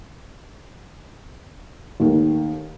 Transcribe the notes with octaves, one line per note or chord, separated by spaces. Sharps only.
D#2 D#3 A3